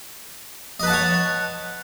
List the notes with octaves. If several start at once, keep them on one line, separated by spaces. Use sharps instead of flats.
B4 C#5 D#5 F#5 A5